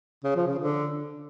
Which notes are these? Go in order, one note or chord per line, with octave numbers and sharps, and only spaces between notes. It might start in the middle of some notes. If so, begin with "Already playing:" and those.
C#3
F3
C#3
D3